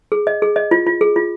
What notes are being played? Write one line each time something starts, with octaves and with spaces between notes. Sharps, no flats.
G#4
D#5
G#4
D#5
F4
F4
G#4
F4